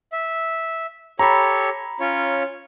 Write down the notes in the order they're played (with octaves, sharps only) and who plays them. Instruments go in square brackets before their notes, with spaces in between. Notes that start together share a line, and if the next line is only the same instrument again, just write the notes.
[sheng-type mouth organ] E5
[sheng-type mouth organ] G4 A4 C#5 [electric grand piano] A#5 B5
[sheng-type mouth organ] C#4 F4 C#5